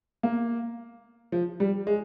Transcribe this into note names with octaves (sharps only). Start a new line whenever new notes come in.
A#3
F3
G3
G#3